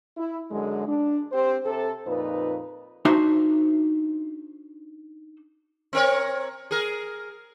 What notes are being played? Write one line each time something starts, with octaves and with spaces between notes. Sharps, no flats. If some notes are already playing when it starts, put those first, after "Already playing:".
E4
F#2 D3 G#3
D4
C4 G4 C5
C3 A4
F2 A#2 D#4 B4
D4 D#4 F#4 C5 E5
C4 A#4 C#5
G#4 A#4